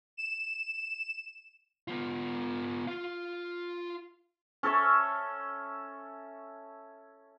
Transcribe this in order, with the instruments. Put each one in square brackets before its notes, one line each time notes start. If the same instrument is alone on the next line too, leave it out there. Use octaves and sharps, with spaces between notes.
[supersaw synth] E7
[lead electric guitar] B3 F4
F4 F5
[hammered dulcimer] C#4 A4 C#5 E5